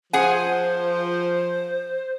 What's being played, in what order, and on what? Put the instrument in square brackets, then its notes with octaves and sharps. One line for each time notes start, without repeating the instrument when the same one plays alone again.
[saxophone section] F3 [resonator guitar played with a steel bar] G#4 F#5 G#5 [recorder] C5